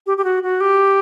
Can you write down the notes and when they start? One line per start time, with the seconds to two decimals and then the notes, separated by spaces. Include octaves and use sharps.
0.07 G4
0.17 G4
0.24 F#4
0.43 F#4
0.61 G4